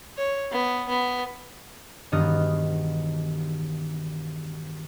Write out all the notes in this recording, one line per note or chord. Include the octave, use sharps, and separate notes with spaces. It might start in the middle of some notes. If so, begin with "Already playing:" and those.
C#5
B3
B3
E1 G2 D#3 B3 D#5 F6